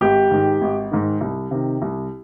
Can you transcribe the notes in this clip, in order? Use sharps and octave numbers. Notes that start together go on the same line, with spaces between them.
G#1 G4
G#2 D#3
G#1
G#2 D#3
C2
C3 D#3
C2